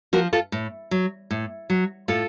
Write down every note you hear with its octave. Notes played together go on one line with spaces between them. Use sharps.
F3 F#4 A#4
F4 A4
A2
F#3
A2
F#3
A2 F4 A4